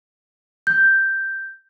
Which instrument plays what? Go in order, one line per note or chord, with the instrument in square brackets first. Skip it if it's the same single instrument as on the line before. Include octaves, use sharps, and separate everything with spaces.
[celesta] G6